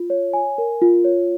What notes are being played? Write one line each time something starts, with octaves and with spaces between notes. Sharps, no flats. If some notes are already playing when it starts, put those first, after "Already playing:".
Already playing: F4
C#5
G#5
A#4
F4
C#5